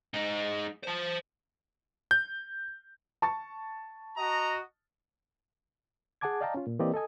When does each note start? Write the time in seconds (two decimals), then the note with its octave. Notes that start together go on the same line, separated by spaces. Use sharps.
0.14 G#3 D#4
0.84 C5 A5
2.11 G6
3.22 A5 C#6 A6
4.17 F#4 D#5 A#5
6.21 G#4 F#5 G#5 A5 D6 G#6
6.41 D5 D#5 F5 G5 A5 A#5
6.55 C#4 F4
6.67 A#2
6.79 E3 A#3 C4 G4 D5 D#5
6.94 A4 D#5 G#5 D#6